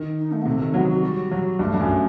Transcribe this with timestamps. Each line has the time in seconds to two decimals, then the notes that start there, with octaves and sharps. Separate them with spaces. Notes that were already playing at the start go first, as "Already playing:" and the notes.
Already playing: D#3
0.18 D#4
0.32 A3
0.41 B3
0.45 C3 A3
0.60 D#3
0.74 F#3 B3
0.88 F#4
1.03 G3 F#4
1.31 F#3
1.59 G2 A3
1.74 G2
1.81 F#2